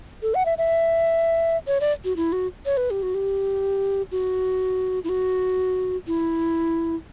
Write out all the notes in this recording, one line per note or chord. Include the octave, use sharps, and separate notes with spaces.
A4
F#5
E5
E5
C#5
D5
F#4
E4
F#4
C#5
B4
G4
F#4
G4
F#4
E4
F#4
E4